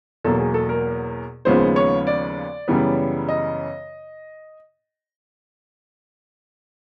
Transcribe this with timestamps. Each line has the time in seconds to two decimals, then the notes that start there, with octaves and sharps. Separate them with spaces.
0.24 E2 B2 F#3 A#3 A4
0.39 G#4
0.54 A4
0.69 A#4
1.45 D#2 C#3 F3 G#3 B3 C5
1.76 C#5
2.07 D5
2.68 F#2 C#3 E3 G3 B3
3.28 D#5